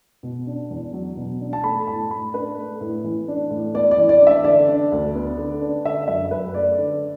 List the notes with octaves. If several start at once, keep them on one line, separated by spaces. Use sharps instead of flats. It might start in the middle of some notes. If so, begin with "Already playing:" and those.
B2
D4
E2
F#3
B2
D4
A5
A3 B5
A2 A5
A2 B5
D4 B4
A3
A2
E3
D4
A2
B3 D5
D5
E3
D5
D4 E5
D3 D5
D4
D2
B3
D3
D4
D3 E5
F#2 E5
F#2 B4
A3 D5
D3